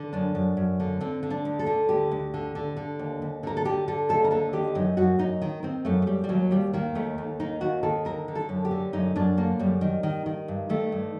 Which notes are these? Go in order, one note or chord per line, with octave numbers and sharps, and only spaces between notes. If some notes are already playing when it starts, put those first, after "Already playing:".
Already playing: D3
F#2 D4
F#2
F#2
D3
D3 C4
D3
D4
D2
A4
D3
D2 G4
D2
D3
D3
D3
D#2
D#2
D3 A#4
A4
D3 G4
D3 A4
D#2 A4
A#4
D3 A4
D#3 G4
F#2 D#4
F#2 F#4
F#2 D#4
D#3
D#3 C4
F#2 A3
A3
F#2 G3
G3
D#2 F#3
D#2 G3
D#3 A#3
D#2 A3
D#2
D#3 D#4
D#2 F#4
D#3 A4
D3 A#4
D3
A4
F#2
G4
D3
F#2 D#4
F#2 D4
D3 A#3
F#2 G3
D#3
D#3
D#3
G2
D#3 A3
G2